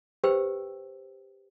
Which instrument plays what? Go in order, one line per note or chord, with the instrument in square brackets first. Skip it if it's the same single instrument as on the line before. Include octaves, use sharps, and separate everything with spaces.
[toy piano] G4 B4 C5 G5 E6